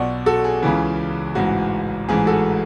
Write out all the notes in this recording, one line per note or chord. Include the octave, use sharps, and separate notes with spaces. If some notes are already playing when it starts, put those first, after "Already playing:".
Already playing: B1 B2 D5 F#5
F#4 A4
G#4
C#2 C#3 E3
A1 G#2 E3 F#4
A1 G#2 E3 G#4
F#4 A4